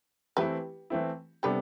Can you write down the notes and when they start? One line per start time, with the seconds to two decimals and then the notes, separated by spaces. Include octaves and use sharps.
0.37 E3 A3 C4 E4 G4 B4
0.90 E3 A3 C4 E4
1.43 C3 G3 B3 D4 G4 A4 B4